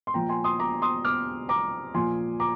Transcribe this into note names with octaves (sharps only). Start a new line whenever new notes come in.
C6
A#2 F3 G5 A#5
G#5 C6
C6 D#6
A#5 D6
C6 D#6
D6 F6
A#5 D6
A#2 F3 G#5 C6
A#5 D6